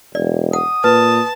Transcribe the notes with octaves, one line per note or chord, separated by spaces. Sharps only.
E1 D5
F#5 D#6
A#2 B4 A5